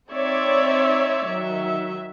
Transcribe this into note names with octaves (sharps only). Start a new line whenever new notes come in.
C4 D#4 C#5 D5 E5
D#3 F#3 E5